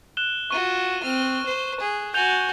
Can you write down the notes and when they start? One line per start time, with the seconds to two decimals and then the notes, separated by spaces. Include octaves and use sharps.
0.17 F#6 E7 G7
0.51 F4 F#4 C#6 D#7
1.03 C4 F6
1.46 C5
1.80 G#4
2.14 F#4 G#5 G6 F7 G7